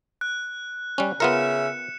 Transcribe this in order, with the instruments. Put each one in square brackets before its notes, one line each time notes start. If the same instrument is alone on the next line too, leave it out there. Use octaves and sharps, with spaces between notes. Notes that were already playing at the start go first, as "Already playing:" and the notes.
[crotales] F#6
[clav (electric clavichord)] G3 C#4
[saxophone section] C#3 E5 [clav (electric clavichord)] B3 F4 A#4 [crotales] C#7 E7